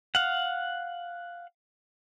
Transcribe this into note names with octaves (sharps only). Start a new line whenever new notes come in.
F5 F#5